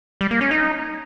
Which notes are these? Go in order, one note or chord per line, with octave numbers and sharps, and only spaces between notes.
G3
A#3
C#4
D#4